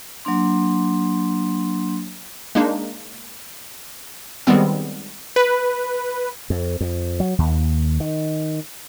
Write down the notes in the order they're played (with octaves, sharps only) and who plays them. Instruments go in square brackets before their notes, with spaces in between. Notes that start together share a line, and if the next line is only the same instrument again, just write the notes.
[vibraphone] F#3 A#3 D4 C6
[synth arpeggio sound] G#3 A#3 D4 D#4
D#3 G3 G#3 B3 C4
[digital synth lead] B4
[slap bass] F2
F2
F#3
D#2
D#3